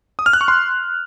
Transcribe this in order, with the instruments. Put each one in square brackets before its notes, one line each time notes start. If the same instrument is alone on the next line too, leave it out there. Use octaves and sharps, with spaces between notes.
[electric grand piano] D#6
F6
F#6
C#6
C6